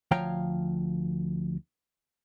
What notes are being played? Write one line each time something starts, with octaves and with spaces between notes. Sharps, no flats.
D2 F3 C#5 F5 G5 A#5